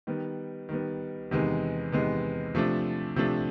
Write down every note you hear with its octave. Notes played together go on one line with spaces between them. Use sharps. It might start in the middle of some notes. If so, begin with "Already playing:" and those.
D#3 G3 B3
D#3 G3 B3
E2 C3 D#3 G#3 B3
E2 C3 D#3 G#3 B3
C3 F3 A3 D4
C3 F3 A3 D4